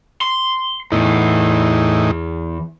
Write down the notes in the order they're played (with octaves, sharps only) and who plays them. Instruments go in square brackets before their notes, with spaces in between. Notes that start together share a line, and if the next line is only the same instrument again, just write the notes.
[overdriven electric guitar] C6
[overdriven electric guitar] E2 [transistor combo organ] A2 E3 D#4